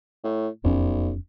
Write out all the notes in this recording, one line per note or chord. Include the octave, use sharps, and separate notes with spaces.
A2
E1 B1 F2 C#4